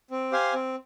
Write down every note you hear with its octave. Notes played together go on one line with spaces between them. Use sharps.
C4
G4 C5 F5 G#5
C4